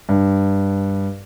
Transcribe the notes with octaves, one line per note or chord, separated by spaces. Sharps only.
G2